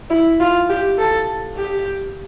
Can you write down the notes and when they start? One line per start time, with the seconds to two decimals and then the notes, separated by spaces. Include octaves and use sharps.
0.10 E4
0.40 F4
0.69 G4
0.98 A4
1.57 G4